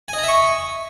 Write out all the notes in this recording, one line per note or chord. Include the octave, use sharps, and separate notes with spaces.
D#5 E5 G#5 A#5 C#6